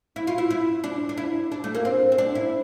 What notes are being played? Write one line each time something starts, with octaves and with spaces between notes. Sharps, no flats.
E4
F4
E4
E4
D4
D4
E4
D4
A3
A#3
C4
C4
D4
E4